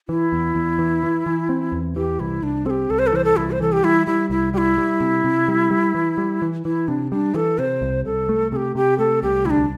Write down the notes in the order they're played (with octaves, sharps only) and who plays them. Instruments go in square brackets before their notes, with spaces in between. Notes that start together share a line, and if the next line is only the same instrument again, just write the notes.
[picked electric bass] E3 [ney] E4
[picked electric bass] E2
E2
E3
E3
E3
C4
E2
[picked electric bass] E3 [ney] G4
[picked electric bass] C2 [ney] E4
[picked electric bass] C2 [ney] D4
[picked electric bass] C4 [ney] A4
[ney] G4
[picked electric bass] C2 [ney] A4
[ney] C5
A4
[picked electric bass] E3 [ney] C5
[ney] A4
[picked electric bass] C2 [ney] E4
[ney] C5
[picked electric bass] E3 [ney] A4
[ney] G4
[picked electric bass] G3 [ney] E4
[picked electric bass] G3 [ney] E4
[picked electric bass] C2 [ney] E4
[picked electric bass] G3 [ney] E4 G4
[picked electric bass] G3
C3
C3
G3
G3
E3
G3
E3
[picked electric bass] E3 [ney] E4
[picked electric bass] C3 [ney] D4
[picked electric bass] G3 [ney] D4
[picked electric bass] E3 [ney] A4
[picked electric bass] C3 [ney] C5
[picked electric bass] C2
[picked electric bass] C2 [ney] A4
[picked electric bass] A3
[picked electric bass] C3 [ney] G4 A4
[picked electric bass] C3 [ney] G4
[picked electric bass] A3 [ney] A4
[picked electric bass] C2 [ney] G4
[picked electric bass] D2 [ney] E4
[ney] D4